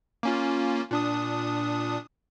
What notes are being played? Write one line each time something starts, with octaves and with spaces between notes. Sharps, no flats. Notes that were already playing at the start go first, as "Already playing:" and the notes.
A#3 C#4 F4
A#2 D4 D#6